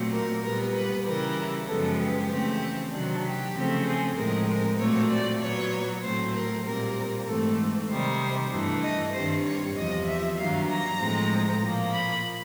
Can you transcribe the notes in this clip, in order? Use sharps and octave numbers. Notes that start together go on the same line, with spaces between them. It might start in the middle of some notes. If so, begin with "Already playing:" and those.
Already playing: A#2 F#3 A3 C4
A#4
A#2 G3 B3 A#4
B4
C#3 E3 G3 A#4
F#2 C#3 F3 G#3 B3 A4
G4
C#3 E3 A3 C4
C3 D#3 F#3 D4
G4
C#3 F3 A3 C4
G#4
A2 F3 G#3 C4 A#4
A#4
A#2 F#3 A3 C4 C#5
D5
A#2 F#3 B3 C#5
A2 F#3 A3 C4 C5
A#4
A#2 G3 C4 A#4
G#2 E3 A3 C4 A4
C3 D#3 G3 C5
G2 E3 A3
D#5
G2 D#3 G3 C4 C5
C#5
E2 C3 F3 D#5
E5
G2 D#3 F#3 A#3 F5
A#5
A2 F3 G#3 C4
A#2 F3 A#3
B5